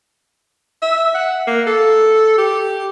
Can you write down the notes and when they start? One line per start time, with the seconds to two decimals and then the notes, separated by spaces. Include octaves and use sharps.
0.82 E5
1.15 F#5
1.47 A#3
1.67 A4
2.38 G4